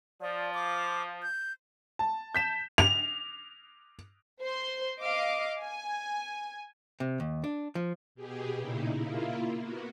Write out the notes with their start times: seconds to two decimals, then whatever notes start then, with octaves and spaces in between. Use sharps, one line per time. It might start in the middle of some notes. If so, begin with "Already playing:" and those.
0.21 F3 D5
0.54 D6
1.22 G6
1.99 A5
2.35 G6 B6 E7
2.78 F7
4.41 C5 C6
5.02 D#5 F5 D6
5.62 G#5
7.00 C3
7.20 D#2
7.44 D4
7.75 F3
8.15 B2 G4 G#4
8.55 A#2 C#3 D#4 E4
8.96 A#3 E4 F4
9.59 A#3 B3 F#4